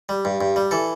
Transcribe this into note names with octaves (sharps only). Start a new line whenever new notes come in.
G3
G2
G2
G3
E3 A4